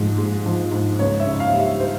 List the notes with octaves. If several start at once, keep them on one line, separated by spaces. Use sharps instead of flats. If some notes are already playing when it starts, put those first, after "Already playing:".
Already playing: G#2 F3 G#3
G#3
F3
G#2
C#2 C#5
E5
C#3
F5
G3
E5
C5